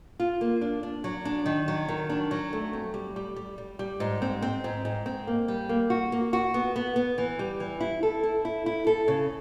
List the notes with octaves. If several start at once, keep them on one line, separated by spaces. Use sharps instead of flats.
F4
A#3
D4
D4
F#3
D4
D#3
F#3
D#3
D4
F#3
A3
C4
G3
G3
G3
G3
G3
G#2
C4
C4
G#2
G#2
C4
A#3
G3
A#3
F#4
A#3
F#4
B3
B3
B3
E3
G3
E3
E4
A4
E4
E4
E4
A4
C#3